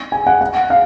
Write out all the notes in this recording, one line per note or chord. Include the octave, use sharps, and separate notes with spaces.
G#5
F#5
F#5
F5